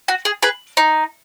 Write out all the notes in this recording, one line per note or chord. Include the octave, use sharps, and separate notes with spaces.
F#4
G#4
G#4 B4
D#4